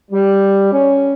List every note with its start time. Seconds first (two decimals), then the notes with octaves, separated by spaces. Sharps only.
0.11 G3
0.71 C#4